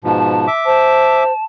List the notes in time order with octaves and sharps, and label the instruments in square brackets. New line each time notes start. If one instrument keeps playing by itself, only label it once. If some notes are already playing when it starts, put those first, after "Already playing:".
[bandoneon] G#2 B2 F3 [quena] A5
[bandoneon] E5 D6
[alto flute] C5 [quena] A5